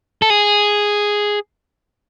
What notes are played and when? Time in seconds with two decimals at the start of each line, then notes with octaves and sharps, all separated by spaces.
0.22 A4
0.30 G#4